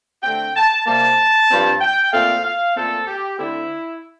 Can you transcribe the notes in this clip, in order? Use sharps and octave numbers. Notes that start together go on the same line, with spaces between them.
D3 A3 C4 G5
A5
C3 G3 A#3 A5
G2 F3 C4
G5
A#2 A3 C4 F5
F5
A#2 A3 C4 A4
G4
D3 A3 C4 E4